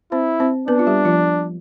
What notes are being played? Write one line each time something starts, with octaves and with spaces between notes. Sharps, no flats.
C4 E4 C5
C4 C5
B3 D4 B4
F4
G3 G4
F3 F4